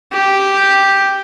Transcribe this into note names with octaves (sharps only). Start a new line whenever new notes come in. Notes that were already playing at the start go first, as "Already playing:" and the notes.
G4